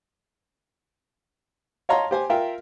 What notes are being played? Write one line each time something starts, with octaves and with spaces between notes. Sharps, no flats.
C#5 D#5 F5 A5 A#5 C6
G4 C5 G#5
F4 A#4 E5 F5 G5